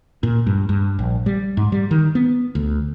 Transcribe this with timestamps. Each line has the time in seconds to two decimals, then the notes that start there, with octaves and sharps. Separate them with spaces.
0.23 A#2
0.47 G2
0.69 G2
0.99 A#1
1.26 G3
1.57 G#2
1.72 G3
1.91 D#3
2.15 B3
2.55 D2